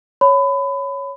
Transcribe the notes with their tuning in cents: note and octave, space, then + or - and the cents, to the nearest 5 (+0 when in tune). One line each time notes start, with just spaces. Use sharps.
C#5 +0 B5 +25